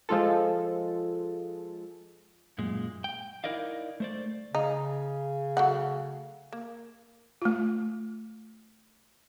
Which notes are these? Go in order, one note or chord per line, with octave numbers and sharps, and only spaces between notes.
F3 G#3 F4 A4
F#2 A#2 G#3
G5
D#4 E4 A#4 D5 D#5 F5
A3 C5 D5
C#3 D#4
F#3 A3 F#5
A#3
A3 F4